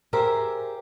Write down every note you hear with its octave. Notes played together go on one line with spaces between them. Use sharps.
G4 G#4 A#4 C5 E5